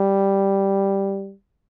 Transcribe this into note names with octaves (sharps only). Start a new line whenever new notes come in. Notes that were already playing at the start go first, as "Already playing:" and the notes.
Already playing: G3